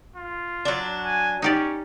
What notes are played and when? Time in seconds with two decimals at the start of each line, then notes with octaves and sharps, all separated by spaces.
0.16 F4
0.65 F#3 D4
1.05 G#5
1.42 C#4 D#4 G4 D5